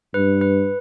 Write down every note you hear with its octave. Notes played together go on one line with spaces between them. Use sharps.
G2 B4
B4